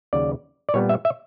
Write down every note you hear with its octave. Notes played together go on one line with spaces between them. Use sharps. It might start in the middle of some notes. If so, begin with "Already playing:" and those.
D#2 C#3 F#3 D5
D5
A#2 G3 B3 C#5
E5
E5